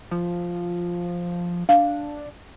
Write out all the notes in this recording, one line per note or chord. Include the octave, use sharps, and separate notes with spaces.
F3
D4 F5